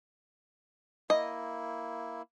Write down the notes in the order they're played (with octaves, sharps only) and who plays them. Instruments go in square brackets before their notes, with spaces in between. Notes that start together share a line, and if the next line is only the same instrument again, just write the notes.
[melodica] A#3 E4 [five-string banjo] D#5